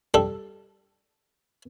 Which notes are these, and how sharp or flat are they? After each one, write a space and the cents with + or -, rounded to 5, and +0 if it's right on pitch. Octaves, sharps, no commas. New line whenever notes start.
G3 +0 A4 +0